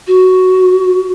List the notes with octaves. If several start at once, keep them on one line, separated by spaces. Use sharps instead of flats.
F#4